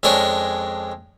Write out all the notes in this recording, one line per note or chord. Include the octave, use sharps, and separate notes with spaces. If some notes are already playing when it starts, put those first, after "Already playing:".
F2 G#3 C#4 D4 A#4 C#5